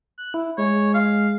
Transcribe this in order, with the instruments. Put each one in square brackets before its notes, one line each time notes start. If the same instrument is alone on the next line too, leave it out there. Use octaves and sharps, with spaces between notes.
[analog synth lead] F#6
E4
[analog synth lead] G#3 [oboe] C#5
[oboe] F5